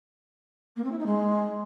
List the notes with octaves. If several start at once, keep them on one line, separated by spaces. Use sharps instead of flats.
A#3
C4
E4
D#4
G#3